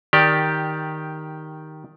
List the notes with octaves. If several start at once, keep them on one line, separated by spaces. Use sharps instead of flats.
D#3 G4 D5